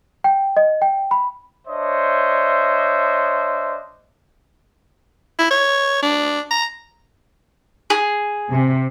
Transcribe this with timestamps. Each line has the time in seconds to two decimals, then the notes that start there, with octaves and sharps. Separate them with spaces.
0.24 G5
0.57 D#5
0.82 G5
1.11 B5
1.67 D4 C5 C#5 D#5 E5
5.39 E4
5.51 C#5
6.03 D4
6.51 A#5
7.90 G#4
8.50 C3